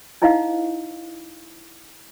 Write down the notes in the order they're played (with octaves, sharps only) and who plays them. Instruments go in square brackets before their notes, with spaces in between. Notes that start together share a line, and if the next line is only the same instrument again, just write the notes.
[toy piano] D#4 E4 C5 D#5 F5 F#5